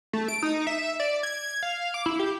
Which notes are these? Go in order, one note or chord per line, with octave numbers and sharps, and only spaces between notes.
A3
D7
D#4
E5
D5
G#6
F5
D6
E4
G4